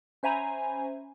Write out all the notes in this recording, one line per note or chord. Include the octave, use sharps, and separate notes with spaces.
C#4 C5 E5 G#5 A#5 B5